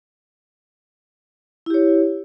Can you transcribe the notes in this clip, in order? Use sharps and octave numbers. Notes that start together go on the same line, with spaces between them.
E4 G4 C#5